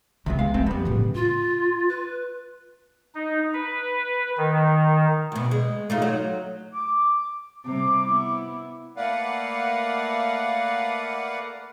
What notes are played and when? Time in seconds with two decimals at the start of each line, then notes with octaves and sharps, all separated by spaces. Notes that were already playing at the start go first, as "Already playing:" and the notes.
0.26 C#2 C3 F#3 B3
0.39 G#3 F5
0.54 F2 A3 B3 C4
0.66 G3 B3
0.85 A2 C#3
1.15 F4
1.89 B4
3.15 D#4
3.54 B4
4.38 D#3
5.32 D2 B2
5.51 G#3
5.90 A3 D#4 F4
6.02 F#3
6.74 D6
7.65 C3 G3 D6
8.05 B3 E4
8.97 A3 A#3 B4 D5 F5 F#5